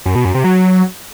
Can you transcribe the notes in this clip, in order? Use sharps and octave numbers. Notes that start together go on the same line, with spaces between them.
F#2
B2
F#2
C3
F#3